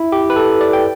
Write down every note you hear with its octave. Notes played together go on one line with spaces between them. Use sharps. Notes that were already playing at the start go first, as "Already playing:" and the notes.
Already playing: E4
G4
B4
A4
D5
G5